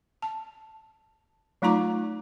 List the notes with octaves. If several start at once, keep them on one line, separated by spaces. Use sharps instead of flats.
A5
F#3 A3 D#4 F4 A#5 D6